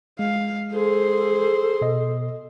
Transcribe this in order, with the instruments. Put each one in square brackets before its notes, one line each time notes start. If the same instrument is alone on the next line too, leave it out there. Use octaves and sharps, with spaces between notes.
[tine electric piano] G#3 [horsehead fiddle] F5
[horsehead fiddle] G#4 C5 [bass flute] A4
[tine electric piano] B2 D#5